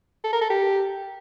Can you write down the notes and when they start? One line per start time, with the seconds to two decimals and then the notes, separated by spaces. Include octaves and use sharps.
0.24 A4
0.33 A#4
0.41 A4
0.50 G4